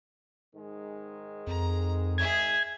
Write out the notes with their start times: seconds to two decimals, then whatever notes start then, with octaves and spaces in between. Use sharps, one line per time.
0.54 G#2 D#3 G#3
1.47 F2 A#5
2.18 G#4 E5 G#6